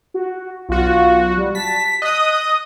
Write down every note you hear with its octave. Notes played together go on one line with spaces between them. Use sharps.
F#4
B1 F4 F#4
G3
A5 B6
D#5 D#6 F#6